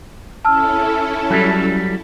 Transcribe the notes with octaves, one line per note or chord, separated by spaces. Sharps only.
C#4 E4 A4 A5 E6 F6
F#3 G3